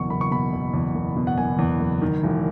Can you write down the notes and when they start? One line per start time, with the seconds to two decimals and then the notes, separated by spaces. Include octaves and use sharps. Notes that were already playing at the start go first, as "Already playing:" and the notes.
Already playing: F#1 E2 B2 C#6
0.10 F#1 B5
0.21 C#6
0.31 B2 B5
0.53 F#1
0.73 E2
0.95 F#1
1.16 B2
1.27 F#5
1.38 F#1 G#5
1.59 E2
1.80 F#1
2.02 D#3
2.23 E1